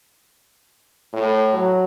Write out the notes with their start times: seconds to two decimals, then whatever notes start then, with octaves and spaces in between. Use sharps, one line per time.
1.13 A2
1.53 F#3